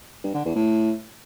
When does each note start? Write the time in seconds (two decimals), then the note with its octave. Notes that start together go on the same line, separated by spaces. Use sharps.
0.24 G2
0.34 D3
0.45 E2
0.56 A2